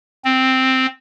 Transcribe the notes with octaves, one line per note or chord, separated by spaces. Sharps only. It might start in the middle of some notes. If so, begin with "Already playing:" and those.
C4